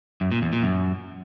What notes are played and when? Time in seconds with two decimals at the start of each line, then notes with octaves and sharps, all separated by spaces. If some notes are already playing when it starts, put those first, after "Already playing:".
0.21 F#2
0.32 A#2
0.42 E2
0.53 A#2
0.63 F#2